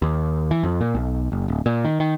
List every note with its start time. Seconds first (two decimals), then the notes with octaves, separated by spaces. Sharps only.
0.02 D#2
0.51 E3
0.63 F2
0.81 A#2
0.95 B1
1.32 F#1
1.48 D1
1.66 A#2
1.85 D#3
2.00 D#3